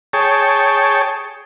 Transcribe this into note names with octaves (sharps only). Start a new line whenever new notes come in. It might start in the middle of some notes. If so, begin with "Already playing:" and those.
G#4 C#5 G5 A5